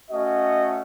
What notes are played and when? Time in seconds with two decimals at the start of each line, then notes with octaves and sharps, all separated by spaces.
0.10 A3 C#4 F#4 D#5